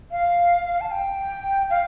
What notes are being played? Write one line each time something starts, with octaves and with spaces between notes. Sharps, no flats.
F5
A5
G5
F5